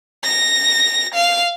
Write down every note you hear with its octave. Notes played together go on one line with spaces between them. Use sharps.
A#6
F5